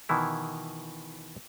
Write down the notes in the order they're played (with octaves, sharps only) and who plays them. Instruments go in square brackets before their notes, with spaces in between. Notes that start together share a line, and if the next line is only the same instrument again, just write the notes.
[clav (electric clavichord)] B2 D#3 E3 E4